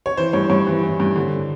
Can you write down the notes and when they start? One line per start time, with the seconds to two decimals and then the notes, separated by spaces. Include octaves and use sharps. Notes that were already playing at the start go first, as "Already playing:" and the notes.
0.06 C#5
0.17 E3 C5
0.33 G2 C#5
0.50 G2 C#5
0.67 E3
0.83 E3
1.00 G2
1.16 D3